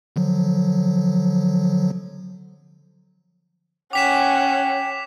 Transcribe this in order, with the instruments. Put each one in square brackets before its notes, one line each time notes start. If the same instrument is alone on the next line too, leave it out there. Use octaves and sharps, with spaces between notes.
[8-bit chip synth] D3 F3 F#3
[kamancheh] C#4 F#5 [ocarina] G5 [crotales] D6 B6 E7